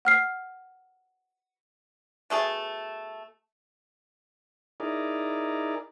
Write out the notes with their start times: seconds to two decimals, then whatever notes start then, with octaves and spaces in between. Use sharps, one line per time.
0.05 F#5 F6 C7
2.30 B2 A3 G#4 A5
4.80 D#4 E4 G#4 A#4 D5